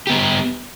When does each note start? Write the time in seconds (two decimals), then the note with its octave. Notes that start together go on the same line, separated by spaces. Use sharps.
0.07 G4
0.10 B3
0.12 G3